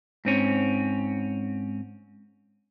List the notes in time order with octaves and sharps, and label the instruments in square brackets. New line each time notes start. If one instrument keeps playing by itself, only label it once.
[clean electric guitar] G#2 C4 C#4